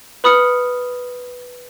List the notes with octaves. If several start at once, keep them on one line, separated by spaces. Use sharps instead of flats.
B4 B5 D#6 F6 C#7